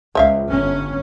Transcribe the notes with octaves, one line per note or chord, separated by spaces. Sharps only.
C#2 C5 E5 F5
G1 C#4